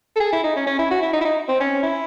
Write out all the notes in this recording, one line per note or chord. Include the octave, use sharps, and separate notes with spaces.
A4
G#4
E4
D#4
C#4
C#4
E4
F#4
E4
D#4
E4
D#4
C4
C#4
E4